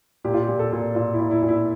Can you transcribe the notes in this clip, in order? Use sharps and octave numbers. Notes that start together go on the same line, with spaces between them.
A#2 G4
F4
A#2 G4
A4
A#2
A#2 F4
E4
A#2
E4
A#2
E4